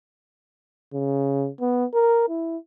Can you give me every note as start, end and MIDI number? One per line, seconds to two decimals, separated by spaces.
0.94 1.49 49
1.60 1.85 59
1.94 2.26 70
2.29 2.57 64